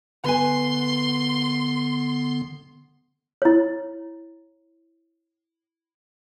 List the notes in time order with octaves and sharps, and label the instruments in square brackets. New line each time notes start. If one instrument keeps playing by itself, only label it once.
[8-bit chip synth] D3 B3 [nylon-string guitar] B4 G#5 [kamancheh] C6
[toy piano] E4 C#5